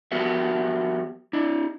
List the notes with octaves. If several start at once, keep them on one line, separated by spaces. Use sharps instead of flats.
F3 B3 F#4 G4 A#4 E5
D4 E4